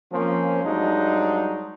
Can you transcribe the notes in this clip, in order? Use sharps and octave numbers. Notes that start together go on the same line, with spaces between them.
F3 A#3 C4 C#4
G2 F#3 G#3 D4 D#4